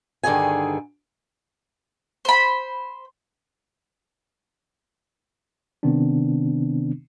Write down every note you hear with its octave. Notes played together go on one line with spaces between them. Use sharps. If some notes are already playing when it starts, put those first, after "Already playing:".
G2 D3 D#3 G#4 G#5
C5 B5
C3 D#3 B3 C4 D4